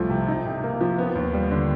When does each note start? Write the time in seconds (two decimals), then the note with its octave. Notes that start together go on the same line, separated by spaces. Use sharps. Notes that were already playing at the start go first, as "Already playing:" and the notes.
Already playing: C2 F3 A3
0.10 C3
0.28 D#4
0.45 C3
0.63 A#3
0.81 F3
0.98 B3
1.15 D#2
1.34 G3
1.51 D3